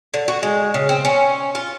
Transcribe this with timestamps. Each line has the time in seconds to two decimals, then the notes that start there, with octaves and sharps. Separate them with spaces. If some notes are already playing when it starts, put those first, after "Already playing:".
0.14 D3
0.28 F#4
0.43 G#3
0.74 C#3
0.89 C4
1.05 C#4
1.55 F4